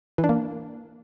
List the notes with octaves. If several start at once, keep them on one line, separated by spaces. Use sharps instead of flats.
E3
D4
A#3